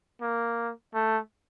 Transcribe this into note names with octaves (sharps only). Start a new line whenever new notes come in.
A#3
A3